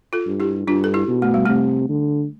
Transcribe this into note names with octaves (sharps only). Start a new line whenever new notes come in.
F4 A4
G2
E4 G4
G2 D4 F4
A4
E4 G4
B2
A3
G3
C3 A3
D3